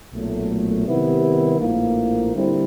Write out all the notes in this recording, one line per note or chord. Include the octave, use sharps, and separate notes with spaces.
B1 A#2 F#3 A3
C3 D#3 G3 B3 E4
A#1 A2 F3 A#3
D3 G3 C4 E4